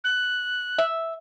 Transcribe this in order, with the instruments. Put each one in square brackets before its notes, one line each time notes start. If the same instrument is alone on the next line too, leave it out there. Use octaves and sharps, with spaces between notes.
[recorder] F#6
[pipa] E5